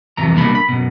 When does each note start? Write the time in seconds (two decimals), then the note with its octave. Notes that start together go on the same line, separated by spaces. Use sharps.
0.17 C2 F2 E3 A#5
0.33 C2 B2 A#3 D4 B5
0.55 B5
0.68 F#2 B2